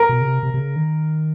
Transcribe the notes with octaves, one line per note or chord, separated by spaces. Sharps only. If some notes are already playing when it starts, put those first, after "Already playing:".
Already playing: A#4
B2
C#3
C3
C3
C3
C#3
D#3